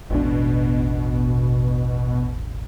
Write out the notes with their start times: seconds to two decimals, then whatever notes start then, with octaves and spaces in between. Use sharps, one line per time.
0.10 E1 A1 B2 D4